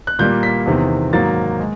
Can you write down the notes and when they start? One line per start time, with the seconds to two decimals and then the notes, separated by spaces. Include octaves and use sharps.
0.07 F#6
0.19 A#2 G3 A#3 G6
0.43 B6
0.66 E2 C3 D#3
1.12 G#2 D#3 F#3 A#3 A6
1.60 G#3